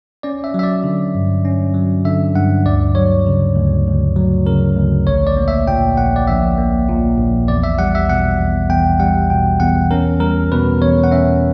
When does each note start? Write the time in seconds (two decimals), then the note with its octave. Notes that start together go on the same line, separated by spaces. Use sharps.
0.23 C#4 D5
0.44 E5
0.54 F#3 E5
0.63 D5
0.84 D3
1.15 G2
1.45 C#4
1.74 F#3
2.05 D3 E5
2.35 G2 F#5
2.66 D2 D5
2.95 F#3 C#5
3.26 C#3
3.56 D2
3.87 D2
4.16 F#3
4.47 C#3 A#4
4.76 D2
5.07 A#1 C#5
5.27 D5
5.37 A#3
5.48 E5
5.68 A#2 G5
5.97 A#1 F#5
6.16 D5
6.27 A#1 E5
6.58 A#3
6.89 A#2
7.18 A#1
7.48 E2 D5
7.63 E5
7.79 G3 F#5
7.95 E5
8.09 B2 F#5
8.39 E2
8.69 E2 G5
9.00 G3 F#5
9.30 B2 G5
9.60 E2 F#5
9.91 C#4 A#4
10.20 G3 A#4
10.52 B2 B4
10.81 E2 C#5
11.04 F#5
11.11 C#4 E5